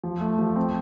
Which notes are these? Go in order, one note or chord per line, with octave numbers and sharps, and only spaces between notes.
F3
A3
F3
C4